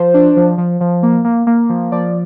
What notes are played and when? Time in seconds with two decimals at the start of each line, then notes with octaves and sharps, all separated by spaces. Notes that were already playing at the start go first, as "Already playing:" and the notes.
Already playing: F3 C5
0.14 D4
0.36 F3
0.58 F3
0.81 F3
1.03 A#3
1.25 A#3
1.47 A#3
1.69 F3
1.92 F3 D5